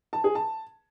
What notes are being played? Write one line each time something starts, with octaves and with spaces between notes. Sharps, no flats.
A5
G#4
A5